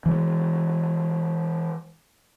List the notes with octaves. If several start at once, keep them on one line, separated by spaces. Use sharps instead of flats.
E3 G#3